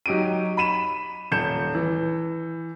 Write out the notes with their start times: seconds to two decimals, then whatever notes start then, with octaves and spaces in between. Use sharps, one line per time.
0.06 F#3 D#4 G4 D7 D#7
0.57 B5 B6 D#7 E7
1.31 D#1 G6 C#7 E7
1.75 E3